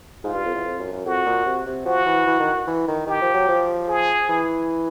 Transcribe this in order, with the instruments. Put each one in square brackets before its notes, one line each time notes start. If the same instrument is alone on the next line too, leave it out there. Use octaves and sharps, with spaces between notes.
[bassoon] G#2 [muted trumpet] F4
[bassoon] G2
F2
E2
F2
F#2
F#2
[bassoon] F2 [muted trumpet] F#4
[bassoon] A#2
C3
C3
[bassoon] F3 [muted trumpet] F#4
[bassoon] E3
E3
D#3
E3
D#3
[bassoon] D#3 [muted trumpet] G4
[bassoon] F3
F#3
F3
[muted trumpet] G#4
[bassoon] E3